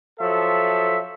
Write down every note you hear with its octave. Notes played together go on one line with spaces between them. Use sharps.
F3 F#3 A4 E5